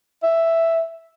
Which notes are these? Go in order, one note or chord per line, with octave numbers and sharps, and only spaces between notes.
E5